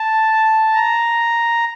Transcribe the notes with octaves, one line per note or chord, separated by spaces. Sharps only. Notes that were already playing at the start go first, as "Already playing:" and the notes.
Already playing: A5
A#5